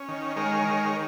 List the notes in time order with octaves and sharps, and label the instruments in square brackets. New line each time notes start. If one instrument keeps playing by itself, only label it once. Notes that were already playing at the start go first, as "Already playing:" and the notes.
Already playing: [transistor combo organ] C#4
D#3
G#3 A#4 C#5
D#3